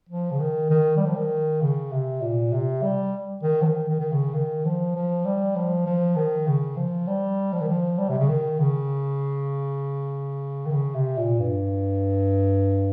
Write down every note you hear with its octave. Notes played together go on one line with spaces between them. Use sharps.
F3
C#3
D#3
D#3
G3
F3
D#3
C#3
C3
A#2
C3
G3
D#3
F3
D#3
D#3
D#3
C#3
D#3
F3
F3
G3
F3
F3
D#3
C#3
F3
G3
F3
D#3
F3
G3
C3
C#3
D#3
C#3
D#3
C#3
C3
A#2
G2